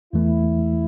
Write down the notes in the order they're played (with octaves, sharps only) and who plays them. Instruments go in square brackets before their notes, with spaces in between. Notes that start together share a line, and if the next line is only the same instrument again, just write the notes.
[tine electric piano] E2 E3 A3 [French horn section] E4